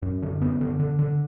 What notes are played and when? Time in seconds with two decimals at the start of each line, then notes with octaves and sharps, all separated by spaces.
0.02 F#2
0.22 D3
0.41 F#2 B3
0.61 D3
0.79 D3
0.99 D3